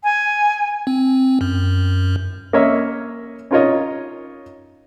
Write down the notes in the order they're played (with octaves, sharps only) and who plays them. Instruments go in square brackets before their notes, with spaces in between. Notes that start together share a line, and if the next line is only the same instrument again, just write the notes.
[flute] G#5
[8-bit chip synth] C4
F#2
[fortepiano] A#3 C#4 C#5 D#5 E5
C#4 D#4 F4 A#4 C#5 D#5